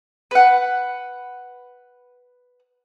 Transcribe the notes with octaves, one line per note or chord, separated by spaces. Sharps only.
B4 F#5